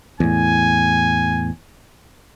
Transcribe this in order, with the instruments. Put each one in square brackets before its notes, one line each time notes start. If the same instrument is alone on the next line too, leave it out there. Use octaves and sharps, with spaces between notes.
[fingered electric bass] E2 A2 [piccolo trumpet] G#5